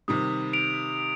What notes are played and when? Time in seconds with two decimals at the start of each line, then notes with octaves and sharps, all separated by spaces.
0.08 C3 D#3 G3 D#6
0.53 D7 F7